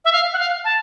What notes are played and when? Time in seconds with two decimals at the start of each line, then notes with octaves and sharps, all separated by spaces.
0.05 E5
0.12 F5
0.33 F#5
0.39 F5
0.65 A5